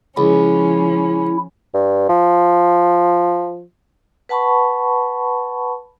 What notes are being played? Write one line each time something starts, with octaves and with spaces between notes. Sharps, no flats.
C#2 F3 C#4 E4
G2
F3
B4 F#5 A5 B5 C#6